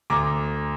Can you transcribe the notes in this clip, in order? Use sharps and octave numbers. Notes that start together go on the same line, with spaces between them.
D2 A#5 D6